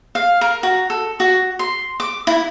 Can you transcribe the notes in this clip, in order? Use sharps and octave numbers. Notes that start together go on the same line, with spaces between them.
F5
A#4
F#4
A4
F#4
C6
D6
E4